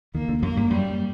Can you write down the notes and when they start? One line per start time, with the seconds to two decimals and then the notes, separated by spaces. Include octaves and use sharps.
0.14 D#2 D#3 A#3
0.28 D2 D3
0.42 F#2 F#3 A#3
0.56 G2 G3
0.70 F#2 F#3 G3